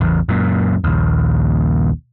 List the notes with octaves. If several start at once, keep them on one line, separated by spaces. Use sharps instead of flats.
A1 E2
F#2 A#2
A#1 D#2